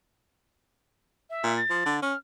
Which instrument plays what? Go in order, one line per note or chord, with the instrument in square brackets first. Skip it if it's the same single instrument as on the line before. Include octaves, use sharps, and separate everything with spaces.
[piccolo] E5
[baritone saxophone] A#2
[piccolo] A6
[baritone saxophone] F3
D3
[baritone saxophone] C#4 [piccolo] F6